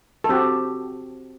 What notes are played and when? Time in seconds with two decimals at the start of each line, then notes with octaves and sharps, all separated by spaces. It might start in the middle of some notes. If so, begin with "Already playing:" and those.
0.24 A4
0.29 C4 F#4 G4